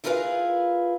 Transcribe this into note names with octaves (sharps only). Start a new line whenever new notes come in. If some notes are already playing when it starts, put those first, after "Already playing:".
E4 F4 G#4 A#4 B4 F5